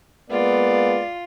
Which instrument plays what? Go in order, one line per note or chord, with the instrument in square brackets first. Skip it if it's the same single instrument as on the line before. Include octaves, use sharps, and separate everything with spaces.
[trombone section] G#3 A#3 B3 [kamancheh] F4 [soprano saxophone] D5